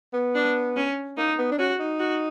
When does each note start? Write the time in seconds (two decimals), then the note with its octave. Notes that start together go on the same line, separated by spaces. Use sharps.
0.14 B3
0.35 D4
0.76 C#4
1.17 A#3 D#4
1.39 B3
1.52 D4
1.58 C#4 F#4
1.79 D#4
1.99 F#4